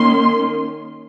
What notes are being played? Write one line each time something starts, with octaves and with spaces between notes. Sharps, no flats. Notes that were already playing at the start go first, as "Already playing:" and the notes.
Already playing: D#3 A#3 C#4 C6